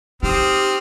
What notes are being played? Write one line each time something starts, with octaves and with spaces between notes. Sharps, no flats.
C4 D#4 G4 D#6 F6